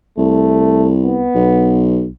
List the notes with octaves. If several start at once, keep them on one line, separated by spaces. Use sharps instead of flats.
C2 A3
B3
B1